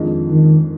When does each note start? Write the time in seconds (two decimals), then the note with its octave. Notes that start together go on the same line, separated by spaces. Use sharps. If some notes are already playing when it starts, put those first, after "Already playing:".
Already playing: F2 D#3 G#3 D4 F4
0.30 D#3